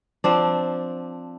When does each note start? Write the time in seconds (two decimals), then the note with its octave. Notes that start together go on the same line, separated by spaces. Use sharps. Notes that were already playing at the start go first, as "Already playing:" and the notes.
0.24 F3 C4 D4